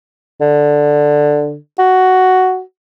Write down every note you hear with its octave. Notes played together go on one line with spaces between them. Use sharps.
D3
F#4